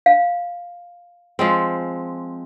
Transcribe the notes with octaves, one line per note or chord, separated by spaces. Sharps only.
F5
F3 G#3 C4